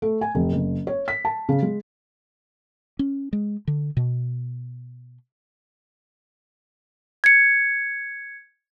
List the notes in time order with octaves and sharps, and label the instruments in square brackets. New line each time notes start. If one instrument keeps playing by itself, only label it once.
[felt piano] A3
G#5
F1
F#1
C#5
B6
A5
C#3
G#3
[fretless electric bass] C#4
G#3
D3
B2
[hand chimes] G#6 C#7